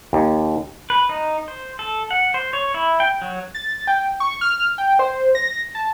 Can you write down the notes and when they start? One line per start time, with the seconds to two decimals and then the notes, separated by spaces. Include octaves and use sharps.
0.13 D#2
0.90 B4
1.09 D#4
1.48 C5
1.79 A4
2.11 F#5
2.34 C5
2.53 C#5
2.74 E4
3.00 G5
3.22 F#3
3.55 A6
3.87 G5
4.20 C#6
4.41 F6
4.78 G5
4.99 C5
5.35 A#6
5.75 A5